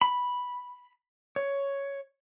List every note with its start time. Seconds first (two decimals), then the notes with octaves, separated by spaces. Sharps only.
0.01 B5
1.36 C#5